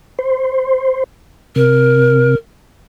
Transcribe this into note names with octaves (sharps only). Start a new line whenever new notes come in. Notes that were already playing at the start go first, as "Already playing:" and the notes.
C5
C3 A#4